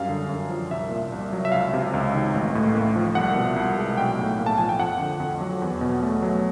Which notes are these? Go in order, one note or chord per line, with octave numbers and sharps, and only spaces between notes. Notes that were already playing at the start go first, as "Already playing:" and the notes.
Already playing: F#2 G3 F5
D3
F#2
F3
C2 E5
A#2
C2
F#3
E5
C#2 F5
C3
C#2
D#3
A1
A2
A#3
F3
C2 F#5
B2
C2
G#3
B1 G5
A2
A#3
A5
F3 G#5
G5
F2 F#5
D3
F2
F#3
E2
B2
A3
F#3